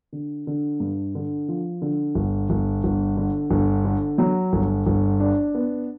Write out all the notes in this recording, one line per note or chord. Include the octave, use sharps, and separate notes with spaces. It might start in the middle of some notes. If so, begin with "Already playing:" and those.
D3
D3
G2
D3
F3
D3
G1
G1
G1
D3
G1
D3
F#3
G1
G1
D4
B3